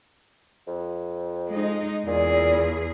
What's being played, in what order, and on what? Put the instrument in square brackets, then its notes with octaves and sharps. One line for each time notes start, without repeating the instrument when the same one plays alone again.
[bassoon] F2
[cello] G#3 D#4
[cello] E2 G#4 [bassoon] A#2